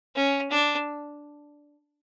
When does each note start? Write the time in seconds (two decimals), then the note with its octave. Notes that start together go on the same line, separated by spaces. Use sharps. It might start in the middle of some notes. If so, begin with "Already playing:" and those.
0.15 C#4
0.51 D4